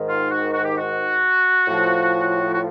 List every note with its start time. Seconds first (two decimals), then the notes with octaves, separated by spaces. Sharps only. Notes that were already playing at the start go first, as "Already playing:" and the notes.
Already playing: G#2 D#3
0.08 F4
0.31 F#4
0.53 F#4
0.65 G4
0.78 F#4
1.68 A2 F3
2.55 F#4